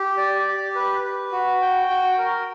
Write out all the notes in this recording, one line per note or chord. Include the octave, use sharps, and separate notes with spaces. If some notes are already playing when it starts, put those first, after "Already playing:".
Already playing: G4
D5
G4
B4
B4
F#4
G5
F#4
A#4